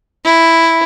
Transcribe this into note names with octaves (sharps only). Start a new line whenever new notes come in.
E4